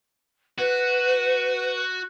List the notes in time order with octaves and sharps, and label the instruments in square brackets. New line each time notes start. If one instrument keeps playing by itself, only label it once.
[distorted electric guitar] F#4 [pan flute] B4